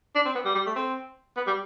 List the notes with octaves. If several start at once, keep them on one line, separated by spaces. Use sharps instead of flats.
D4
C4
B3
G3
G3
A3
C4
B3
G3